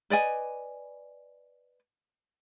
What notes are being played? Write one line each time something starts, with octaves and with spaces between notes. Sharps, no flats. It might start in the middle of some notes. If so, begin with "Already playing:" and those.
B4 D5 D#5 G#5